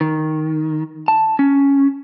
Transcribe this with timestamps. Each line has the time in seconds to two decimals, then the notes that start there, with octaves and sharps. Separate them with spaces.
0.01 D#3
1.08 A5
1.39 C#4